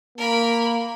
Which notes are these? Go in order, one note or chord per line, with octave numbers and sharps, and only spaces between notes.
A#3 A#4 B5